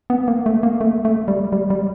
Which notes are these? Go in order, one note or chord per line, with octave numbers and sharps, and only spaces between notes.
B3
A#3
A3
A#3
A3
A3
G3
G3
G3